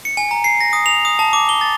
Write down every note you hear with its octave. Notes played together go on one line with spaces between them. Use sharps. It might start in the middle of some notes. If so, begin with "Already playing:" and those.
C#7
G#5
A#5
C7
A#6
D#6
F7
D#6
A5
D6
G7
A6